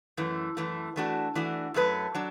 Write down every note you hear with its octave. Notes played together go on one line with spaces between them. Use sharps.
F#2 E3 A3
F#2 E3 A3
E3 A3 D4 F#4
E3 A3 D4 F#4
F#2 F#3 A3 D4 B4
F#3 D4